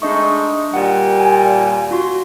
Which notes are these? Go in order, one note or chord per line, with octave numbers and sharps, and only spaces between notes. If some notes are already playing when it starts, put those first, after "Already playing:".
G#3 A3 D4 D#4 D#5 C#6
D#2 A#2 G3 F#5
G#5
F4 F#4 C6